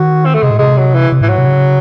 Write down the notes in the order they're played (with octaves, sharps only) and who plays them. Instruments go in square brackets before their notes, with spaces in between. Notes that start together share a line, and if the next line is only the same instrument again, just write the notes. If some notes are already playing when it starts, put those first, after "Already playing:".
Already playing: [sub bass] D#3 [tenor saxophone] F#4
[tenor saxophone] C4
A3
[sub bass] C3 [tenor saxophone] G#3
[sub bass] A2
[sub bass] C3 [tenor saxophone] G#3
[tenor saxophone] F#3
E3
[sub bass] C3
[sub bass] A2 [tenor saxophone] E3
[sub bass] G#2 [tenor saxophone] F#3
[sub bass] C3
C#3